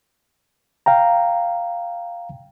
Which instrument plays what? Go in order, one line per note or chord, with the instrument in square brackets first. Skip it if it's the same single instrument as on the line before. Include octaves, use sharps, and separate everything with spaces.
[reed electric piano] F5 G5 A#5